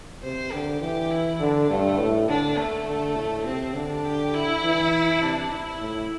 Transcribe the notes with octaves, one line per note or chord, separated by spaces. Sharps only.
C3 C5
D3 G4
E3 G4
E4
D3 D4
G2 A3
A2
D3 D4
A3
D3
A2
C3 C4
D3 D4
G4
E4
E3
C3 D4
E4
A2